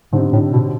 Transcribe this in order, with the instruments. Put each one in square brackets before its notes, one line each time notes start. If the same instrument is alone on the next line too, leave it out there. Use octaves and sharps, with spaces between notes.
[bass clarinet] G#2 [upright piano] D3 G3 C4 D#4
[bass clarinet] A2
B2